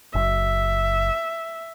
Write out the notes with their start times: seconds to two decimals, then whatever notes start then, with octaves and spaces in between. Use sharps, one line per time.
0.15 F#1 E5